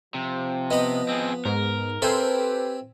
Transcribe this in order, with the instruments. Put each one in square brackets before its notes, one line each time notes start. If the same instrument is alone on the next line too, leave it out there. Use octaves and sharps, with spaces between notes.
[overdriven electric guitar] C3 [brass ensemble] F3
[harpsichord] B3 B5 [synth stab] D#5
[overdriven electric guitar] C4 G#4
[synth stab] G#2 [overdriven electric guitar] A#4
[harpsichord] C4 E5 G#5 [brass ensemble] G4 B4 [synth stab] A4 C5